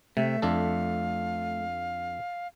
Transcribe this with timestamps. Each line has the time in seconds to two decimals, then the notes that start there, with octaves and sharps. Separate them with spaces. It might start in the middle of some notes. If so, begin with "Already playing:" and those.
0.17 C3 A3 E5
0.42 F2 D4 A4 F5